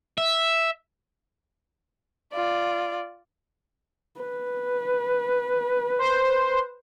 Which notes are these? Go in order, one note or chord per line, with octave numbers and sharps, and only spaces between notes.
E5
F4 D5
B4
C5